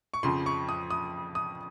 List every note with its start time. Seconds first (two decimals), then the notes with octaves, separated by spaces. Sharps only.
0.14 C#6
0.23 F2 C#3 F3 C6
0.46 C#6
0.69 D#6
0.90 D#6
1.35 D#6